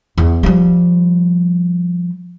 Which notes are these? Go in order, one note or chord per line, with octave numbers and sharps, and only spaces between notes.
E2
F3 G3